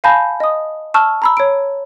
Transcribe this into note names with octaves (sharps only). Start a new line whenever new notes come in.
F5 G#5 A5 B5 G6 A#6
D#5 D#6
A5 C#6 E6 F6
A#5 B5 E6
C#5 D7